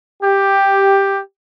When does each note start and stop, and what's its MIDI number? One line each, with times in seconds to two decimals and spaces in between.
0.22 1.19 67